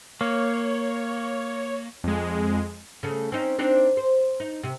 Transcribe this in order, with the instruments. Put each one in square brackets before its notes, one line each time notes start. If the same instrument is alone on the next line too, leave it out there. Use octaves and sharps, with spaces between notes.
[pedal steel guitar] A#3 [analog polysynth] C#5
[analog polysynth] F2 G#3
[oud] C#3 A3
C4 C#4 D#4
C4 D4 D#4
C5
D#4
C3